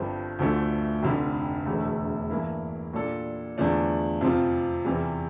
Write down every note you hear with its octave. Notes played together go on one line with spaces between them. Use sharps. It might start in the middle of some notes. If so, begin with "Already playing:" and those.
Already playing: G1 G2 F3 C4 G4
D2 D3 F3 A3
F1 F2 D3 G3
E1 E2 D3 A3
G2 E3 A#3 E4
A#2 G3 D4 A4
E2 D3 F3 A3 D4
F2 C3 F3 C4 F4
E2 C3 E3 G3